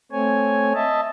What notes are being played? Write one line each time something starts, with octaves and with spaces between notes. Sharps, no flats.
A3 C4 C#5 G#5
D#5 E5 A5